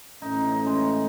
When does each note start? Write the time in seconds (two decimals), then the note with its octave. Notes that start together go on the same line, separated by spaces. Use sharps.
0.22 A2 E3 A3 C#4 D#4
0.36 D#4
0.51 D#4
0.66 G#3